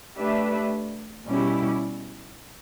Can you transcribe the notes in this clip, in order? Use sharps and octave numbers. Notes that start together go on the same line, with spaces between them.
A3 D4 G4 B4 E5
B2 G3 C#4 E4 G4